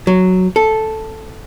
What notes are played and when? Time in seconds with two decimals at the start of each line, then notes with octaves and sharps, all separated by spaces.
0.07 F#3
0.56 A4